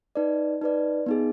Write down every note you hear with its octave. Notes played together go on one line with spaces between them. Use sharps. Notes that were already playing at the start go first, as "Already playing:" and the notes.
D#4 B4 D5
D#4 B4 D5
B3 D#4 G#4